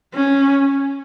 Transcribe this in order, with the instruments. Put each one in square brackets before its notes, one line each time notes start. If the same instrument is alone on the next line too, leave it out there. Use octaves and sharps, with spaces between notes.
[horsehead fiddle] C#4